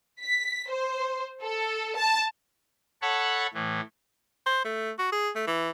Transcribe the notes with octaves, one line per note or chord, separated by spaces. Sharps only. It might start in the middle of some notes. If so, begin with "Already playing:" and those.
B6
C5
A4
A5
A4 C#5 F#5 A5 B5 C#6
A2 E3
C5
A3
F#4
G#4
A3
E3